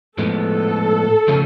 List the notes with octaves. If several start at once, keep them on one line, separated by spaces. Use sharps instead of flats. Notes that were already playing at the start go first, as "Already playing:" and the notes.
A2 F3 G#3 B3 A4
C#3 F3 A3 C#4 G#4